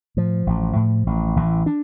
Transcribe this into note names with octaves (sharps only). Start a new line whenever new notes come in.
A2 F3
A1
A2
A1
A1 E3
D4